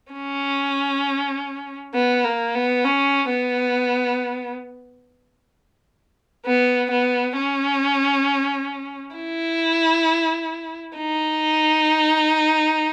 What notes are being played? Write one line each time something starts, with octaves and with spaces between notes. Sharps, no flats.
C#4
B3
A#3
B3
C#4
B3
B3
B3
C#4
E4
D#4